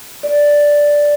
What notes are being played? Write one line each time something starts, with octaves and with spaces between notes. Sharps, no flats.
D5